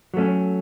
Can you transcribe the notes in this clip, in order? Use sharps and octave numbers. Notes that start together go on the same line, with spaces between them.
F#3 A3 C#4